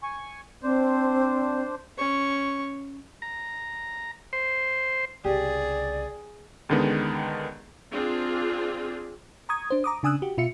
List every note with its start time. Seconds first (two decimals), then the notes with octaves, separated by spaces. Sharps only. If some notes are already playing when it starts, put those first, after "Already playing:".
0.03 G#5 C#6
0.63 C4 D4 C5
1.98 C#4 C#6
3.22 A#5
4.33 C5
5.25 C2 C#3 G4 G#4 D5
6.69 C#2 D3 D#3 G#3 B3
7.92 C4 D4 F4 G#4
9.49 A#5 C#6 D#6 G#6
9.71 D4 C5
9.84 A#5 D6 D#6
10.03 C#3 D4 G#5 D#6 E6 F#6
10.22 F#4 G4
10.38 B2 F4 E5 C#7